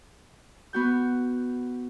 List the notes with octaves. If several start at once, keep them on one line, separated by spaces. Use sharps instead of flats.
B3 F#4 G6